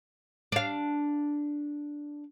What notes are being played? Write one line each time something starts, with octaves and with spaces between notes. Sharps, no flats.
D4 F5